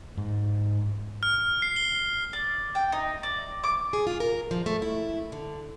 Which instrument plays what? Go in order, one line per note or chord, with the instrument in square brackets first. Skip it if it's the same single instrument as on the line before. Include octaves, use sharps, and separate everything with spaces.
[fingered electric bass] G#2
[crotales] F6
C7
G7
[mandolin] D5
G5
D#4
D5
D6
[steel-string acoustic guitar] G#4
F4
A#4
F3
A3
E4
D3